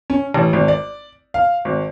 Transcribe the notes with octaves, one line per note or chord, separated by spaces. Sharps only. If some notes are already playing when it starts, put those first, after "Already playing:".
C#4
A1
G#1
D5
F5
G#1